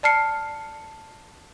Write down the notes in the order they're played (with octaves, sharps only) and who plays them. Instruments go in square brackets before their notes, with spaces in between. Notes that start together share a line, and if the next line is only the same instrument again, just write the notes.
[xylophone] D5 A5 F6 C7 C#7